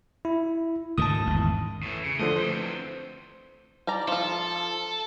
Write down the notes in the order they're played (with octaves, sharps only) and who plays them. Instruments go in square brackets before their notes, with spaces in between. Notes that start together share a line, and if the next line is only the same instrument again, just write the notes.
[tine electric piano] E4
[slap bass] D2 G#2 D#3 [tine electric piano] A5 D#6
[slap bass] G#1 E2
[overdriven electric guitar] A2 E3
C#3
[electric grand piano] D3 F3 A3 [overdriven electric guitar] D#5
[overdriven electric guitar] E3 C4 [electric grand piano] C5
[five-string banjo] G3 D5 A#5
[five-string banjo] F3 F4 [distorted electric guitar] A4